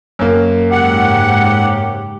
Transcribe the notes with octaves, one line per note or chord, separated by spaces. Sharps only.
F#2 A#3
G#2 C#3 G4 F#5